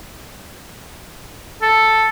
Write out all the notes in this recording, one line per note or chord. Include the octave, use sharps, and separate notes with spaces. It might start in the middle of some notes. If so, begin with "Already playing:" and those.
A4